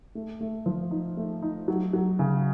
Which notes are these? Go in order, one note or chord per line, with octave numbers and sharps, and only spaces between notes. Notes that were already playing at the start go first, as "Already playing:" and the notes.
A3
A3
F3
D#4
A3
D#4
F#3
F#3
C#3